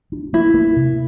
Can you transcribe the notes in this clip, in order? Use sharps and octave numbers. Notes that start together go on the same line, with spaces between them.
D4
A#3 E4
A#3
C3